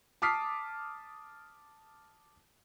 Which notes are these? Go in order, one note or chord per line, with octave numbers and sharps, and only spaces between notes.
A5 D6 D#6 F6 B6 C7